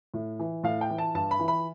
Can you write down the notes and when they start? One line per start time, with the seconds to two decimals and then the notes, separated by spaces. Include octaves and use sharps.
0.14 A2
0.39 E3
0.64 A2 F5
0.81 G5
0.90 E3
0.98 A5
1.15 G2 A5
1.31 B5
1.39 E3
1.48 B5